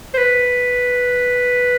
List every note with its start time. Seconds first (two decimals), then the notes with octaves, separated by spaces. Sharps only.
0.14 C5
0.17 B4